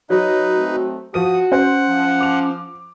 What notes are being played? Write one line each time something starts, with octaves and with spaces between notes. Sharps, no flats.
F#3 D#4 B4 C#5 D#5
A3 C4
F3 F#4 D#6 D#7
C#4 C5 F#5
F3
D6 F7